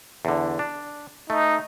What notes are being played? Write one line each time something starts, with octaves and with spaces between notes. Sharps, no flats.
E2 D3
D4
A3 D#4